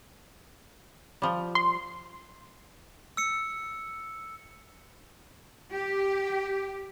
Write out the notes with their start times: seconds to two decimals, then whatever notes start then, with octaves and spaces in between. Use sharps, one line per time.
1.22 F3 G3
1.55 C6
3.17 E6 C#7
5.72 G4